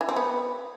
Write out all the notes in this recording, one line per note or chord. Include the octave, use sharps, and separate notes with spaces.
E3
C4
B3